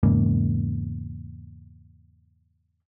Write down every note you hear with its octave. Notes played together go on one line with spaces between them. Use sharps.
E2 G#2 C#3 A#3